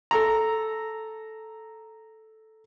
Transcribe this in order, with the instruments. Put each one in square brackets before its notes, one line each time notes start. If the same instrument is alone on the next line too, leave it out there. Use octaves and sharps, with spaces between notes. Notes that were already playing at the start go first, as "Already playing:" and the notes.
[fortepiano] A4 A#5